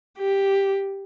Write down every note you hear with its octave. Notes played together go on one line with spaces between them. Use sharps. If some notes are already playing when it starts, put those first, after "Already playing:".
G4